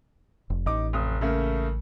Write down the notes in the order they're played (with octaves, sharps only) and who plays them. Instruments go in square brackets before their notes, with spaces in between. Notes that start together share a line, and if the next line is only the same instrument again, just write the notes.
[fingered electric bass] F1
[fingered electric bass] A1 [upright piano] D#4 D6
[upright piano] F1 D#6
C#3 A3 A#3